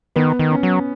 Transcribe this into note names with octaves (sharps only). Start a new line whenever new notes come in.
D#3 B3
D#3
C#4
F#3